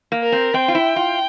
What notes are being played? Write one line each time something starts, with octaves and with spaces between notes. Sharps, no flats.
A#3
A#4
C4
C4 G5
F4
E4
F4